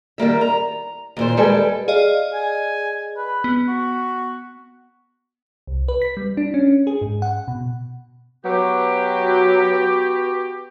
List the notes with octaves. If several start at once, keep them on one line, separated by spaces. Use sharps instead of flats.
D#3 G3 A#3 E5
A#5
D#2 A#2 C5
D#2 G3 G#3 A4 B4 G#5
G#4 D5 D#5 F5
G#5
B4
B3
F#4
C2
B4
B6
G3
D4
C#4
G#4
G#2
F#5
B2
F#3 B3 F#4 G4